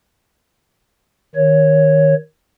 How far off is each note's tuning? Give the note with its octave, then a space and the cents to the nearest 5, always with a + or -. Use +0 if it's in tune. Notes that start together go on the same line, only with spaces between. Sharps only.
D#3 +5 C#5 +0